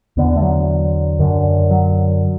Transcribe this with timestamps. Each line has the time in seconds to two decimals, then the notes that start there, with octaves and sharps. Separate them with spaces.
0.17 E2 D3 B3
0.37 A3
0.42 F#3
1.19 F#2 D3
1.71 F#3